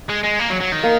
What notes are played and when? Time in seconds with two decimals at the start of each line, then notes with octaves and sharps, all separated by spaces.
0.09 G#3
0.23 G#3
0.39 A#3
0.50 F#3
0.61 F#3
0.72 D#3
0.83 A#3